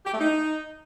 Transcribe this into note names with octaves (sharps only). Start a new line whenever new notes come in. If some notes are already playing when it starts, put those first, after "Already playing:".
G4
A3
D#4